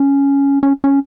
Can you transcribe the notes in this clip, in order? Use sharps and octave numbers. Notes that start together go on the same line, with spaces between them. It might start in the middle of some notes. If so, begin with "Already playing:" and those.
Already playing: C#4
C#4
C#4